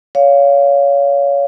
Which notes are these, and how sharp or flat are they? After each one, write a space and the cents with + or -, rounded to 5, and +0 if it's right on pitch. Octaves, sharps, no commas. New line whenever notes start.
C#5 +25 F5 +0